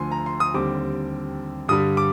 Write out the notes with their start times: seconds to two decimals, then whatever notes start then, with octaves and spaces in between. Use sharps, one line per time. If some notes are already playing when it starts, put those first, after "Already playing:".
Already playing: D2 D3 F3 G#5 C6
0.12 A#5
0.26 C6
0.40 D#6
0.54 D#2 D3 G3 C4 D6
1.68 G2 D3 G3 D#6
1.97 D6